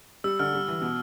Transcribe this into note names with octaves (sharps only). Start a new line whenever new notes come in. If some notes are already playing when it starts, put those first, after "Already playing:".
G3 E6
D3 F6
G3
E3
B2